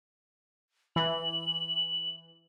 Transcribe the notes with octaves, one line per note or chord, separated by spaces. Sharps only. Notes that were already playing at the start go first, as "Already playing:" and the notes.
E3 F#7